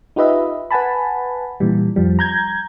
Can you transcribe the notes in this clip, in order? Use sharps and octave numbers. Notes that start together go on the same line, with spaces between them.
D#4 F4 G4 B4 D#5 E5
B4 F#5 G#5 A5 B5
A#2 E3 G3
F2 F3 G3
A#5 G6 G#6